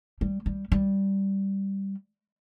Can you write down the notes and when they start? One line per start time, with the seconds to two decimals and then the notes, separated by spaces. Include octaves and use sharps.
0.21 G3
0.46 G3
0.72 G3